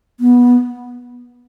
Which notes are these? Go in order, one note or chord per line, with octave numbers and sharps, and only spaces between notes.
B3